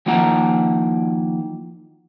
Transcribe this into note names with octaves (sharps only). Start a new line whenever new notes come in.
D#3 F3 A#3 E4 F#5 A#5